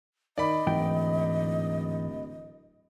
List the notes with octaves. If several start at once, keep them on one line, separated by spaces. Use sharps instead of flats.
D#3 D5 D#5 B5
D1 G#2 E3 G5